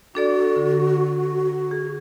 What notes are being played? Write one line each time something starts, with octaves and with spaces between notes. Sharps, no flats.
D4 F#4 A4 D5
D3
G#4